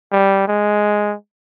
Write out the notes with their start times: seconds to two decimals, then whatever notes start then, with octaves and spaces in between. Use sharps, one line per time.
0.12 G3
0.48 G#3